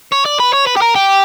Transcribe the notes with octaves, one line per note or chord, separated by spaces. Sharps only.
C#5
D5
B4
C#5
B4
G4
A#4
G4